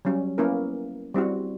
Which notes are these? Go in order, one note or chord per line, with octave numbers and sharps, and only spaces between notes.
F#3 G3 C#4
A#3 B3 C#4 E4 A#4
G3 C4 E4 F#4